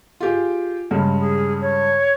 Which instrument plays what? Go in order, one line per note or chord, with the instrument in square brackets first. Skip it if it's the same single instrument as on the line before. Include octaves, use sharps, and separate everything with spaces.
[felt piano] F4 G4 G#4
G2 C#3 G#3
[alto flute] G#4
C#5